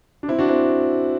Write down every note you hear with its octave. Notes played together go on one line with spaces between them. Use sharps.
D4
C4 E4
D4 F#4
C4 E4